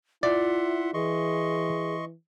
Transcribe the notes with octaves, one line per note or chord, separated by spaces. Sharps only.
E4 F4 D5 E5 F#5 C6
E3 G#4 D#5 C6 C#6